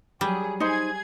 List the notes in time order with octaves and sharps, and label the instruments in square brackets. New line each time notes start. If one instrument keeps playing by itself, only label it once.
[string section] F#3 G#4 [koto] G3
[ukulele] D#4 C5 [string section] G#4 G#6